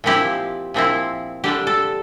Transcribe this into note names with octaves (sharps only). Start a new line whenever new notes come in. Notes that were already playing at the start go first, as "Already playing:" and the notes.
A#2 F3 C4 E4 G4
A#2 F3 C4 E4
D3 G3 D4 G4
A4